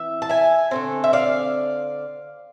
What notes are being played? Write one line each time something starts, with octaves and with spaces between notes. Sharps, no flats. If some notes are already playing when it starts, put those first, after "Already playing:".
Already playing: E3 C4 E5
A5
E5 G#5
D3 A3 C4
E5
D5 F5